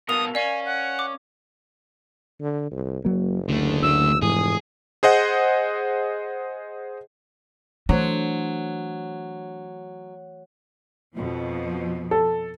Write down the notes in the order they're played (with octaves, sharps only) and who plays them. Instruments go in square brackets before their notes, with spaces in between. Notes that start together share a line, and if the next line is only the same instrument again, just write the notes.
[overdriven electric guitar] B2 A4 [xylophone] A#4 F5 F7 [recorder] D#6
[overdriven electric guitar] C#4 [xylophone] D5 F5 [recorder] G#5
[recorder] F#5
[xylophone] D6
[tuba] D3
C2
[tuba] F#1 [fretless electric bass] F#3 A#3
[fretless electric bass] D2 [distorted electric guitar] D3 A3
[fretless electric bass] D2 [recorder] E6
[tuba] F1 [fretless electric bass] G#2 E3 [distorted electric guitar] G#4 [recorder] D#6
[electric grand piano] G#4 C5 D#5 F#5
[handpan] E3 A3 C5 [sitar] F#3 [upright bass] D4
[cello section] F2 B2 F3
[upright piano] A4